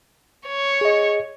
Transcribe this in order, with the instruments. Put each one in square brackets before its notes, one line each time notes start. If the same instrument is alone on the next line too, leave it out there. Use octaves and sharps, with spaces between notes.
[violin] C#5
[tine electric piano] G#4 D#5